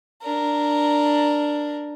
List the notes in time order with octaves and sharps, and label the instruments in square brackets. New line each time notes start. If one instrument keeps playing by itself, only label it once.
[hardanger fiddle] D4 A#4